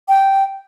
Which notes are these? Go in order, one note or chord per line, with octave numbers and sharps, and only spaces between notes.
G5